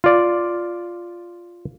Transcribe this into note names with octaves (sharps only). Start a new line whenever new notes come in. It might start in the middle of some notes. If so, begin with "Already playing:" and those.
F4 D5